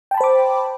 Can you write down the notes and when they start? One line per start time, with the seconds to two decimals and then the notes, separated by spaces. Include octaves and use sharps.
0.11 G5
0.14 A5
0.17 B5
0.21 C5
0.24 D6